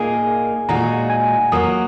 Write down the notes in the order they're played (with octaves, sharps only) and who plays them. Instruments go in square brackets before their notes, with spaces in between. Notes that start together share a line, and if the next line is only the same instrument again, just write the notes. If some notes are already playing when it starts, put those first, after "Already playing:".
Already playing: [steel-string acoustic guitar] A#2 A#3 D#4 G#4 [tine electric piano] G#5
[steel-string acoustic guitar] A#2 G#3 D#4 F#4 [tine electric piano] A#5
[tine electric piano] G#5
[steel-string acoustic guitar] F#3 A#3 F#4 [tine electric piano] D#6